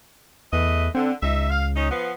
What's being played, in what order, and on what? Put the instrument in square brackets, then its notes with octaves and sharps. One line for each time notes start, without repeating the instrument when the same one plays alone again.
[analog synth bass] E2 [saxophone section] A3 B4 D#5
[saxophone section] D3 [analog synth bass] C4
[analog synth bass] C#2 [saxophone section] D#4 E5
[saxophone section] F5
C#4 D#4
F3 B3